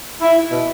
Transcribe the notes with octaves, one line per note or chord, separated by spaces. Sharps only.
E4
E4
B2